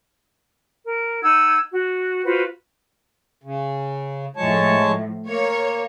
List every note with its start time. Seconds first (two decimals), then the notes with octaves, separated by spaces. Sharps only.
0.84 A#4
1.22 D#4 F#5 E6 G#6
1.70 F#4
2.24 F4 F#4 B4 C5
3.44 C#3
4.36 A2 F3 G#3 C#5 A5
5.28 A#3 C#5